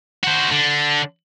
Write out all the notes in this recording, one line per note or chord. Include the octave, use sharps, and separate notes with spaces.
F#4 C5
D3